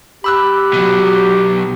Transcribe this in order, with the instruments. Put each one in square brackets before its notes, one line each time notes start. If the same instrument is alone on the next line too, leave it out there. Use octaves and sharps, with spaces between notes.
[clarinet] G4 [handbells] B5 E6 F#6
[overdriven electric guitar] B2 F#3